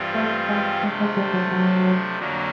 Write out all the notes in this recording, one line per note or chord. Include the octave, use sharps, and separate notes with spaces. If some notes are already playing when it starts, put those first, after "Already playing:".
Already playing: G2 E3 G3 C4 F4
A3
G#3
C3 F3 G#3 A3 D4
G#3
G3
F#3
F#3
F2 D3 F#3 A#3 D4